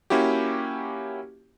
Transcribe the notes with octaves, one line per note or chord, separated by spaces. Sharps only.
A#3 C#4 E4 F#4 G4